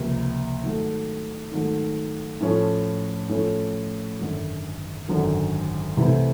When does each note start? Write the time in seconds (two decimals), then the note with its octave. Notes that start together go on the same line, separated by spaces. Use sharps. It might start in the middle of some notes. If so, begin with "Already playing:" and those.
Already playing: C#2 C3 F3 A#3
0.63 G#2 D#3 F#3 A3
1.51 G#2 D#3 F#3 A3
2.41 A2 F3 A3 C#4
3.29 A2 F3 A3 C#4
4.19 G#1 F#2 D3 F#3
5.08 G#1 F#2 D3 F#3
5.97 C2 C3 E3 A3 C4